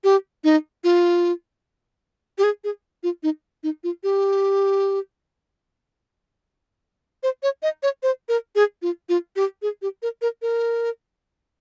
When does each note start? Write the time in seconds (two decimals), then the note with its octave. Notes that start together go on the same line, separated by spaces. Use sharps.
0.04 G4
0.44 D#4
0.84 F4
2.38 G4
2.44 G#4
2.64 G#4
3.03 F4
3.23 D#4
3.63 D#4
3.84 F4
4.03 G4
7.23 C5
7.43 C#5
7.63 D#5
7.83 C#5
8.03 C5
8.29 A#4
8.55 G#4
8.82 F4
9.09 F4
9.36 G4
9.62 G#4
9.82 G4
10.02 A#4
10.22 A#4
10.42 A#4